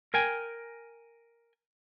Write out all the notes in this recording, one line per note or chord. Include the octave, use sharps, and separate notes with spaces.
A#4 G5 G#5